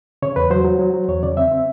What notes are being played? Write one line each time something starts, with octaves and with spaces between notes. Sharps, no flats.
C#3 C#5
E2 B4
F#3 C5
F#3
F#3
F#3
E2 C#5
C#3 D5
C4 E5
C4